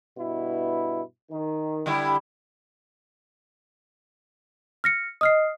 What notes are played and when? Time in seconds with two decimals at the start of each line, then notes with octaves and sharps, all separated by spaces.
0.18 G2 B2 E4
1.31 D#3
1.86 D3 G3 E4
4.84 F6 A#6 C#7
5.21 D#5 D#6 F6 C7